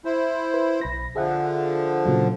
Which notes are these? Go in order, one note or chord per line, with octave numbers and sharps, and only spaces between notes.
E4 C5
B4
B1 B5 A#6
D3 F3 G#4 E5 F#5
A#2 C#3 F#3